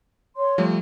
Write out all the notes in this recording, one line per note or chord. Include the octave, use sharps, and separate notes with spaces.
C#5 C6
F3 G3 A3